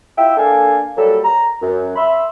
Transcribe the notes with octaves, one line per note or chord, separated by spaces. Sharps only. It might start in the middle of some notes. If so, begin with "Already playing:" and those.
E4 F4 E5 G5
A#3 D4 A4 F5 G#5
F#3 G3 A#3 A4
A#5
F#2
E5 B5 C6